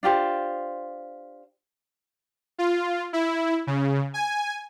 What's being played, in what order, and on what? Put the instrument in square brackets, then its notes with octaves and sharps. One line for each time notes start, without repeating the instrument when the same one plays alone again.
[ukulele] D4 F4 G4 C5
[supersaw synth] F4
E4
C#3
G#5